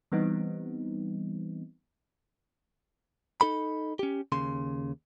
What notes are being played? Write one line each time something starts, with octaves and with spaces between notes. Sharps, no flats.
E3 G3 B3 C4 D#4
D#4 A4 B5
C#4 G4
D#2 C#3 C6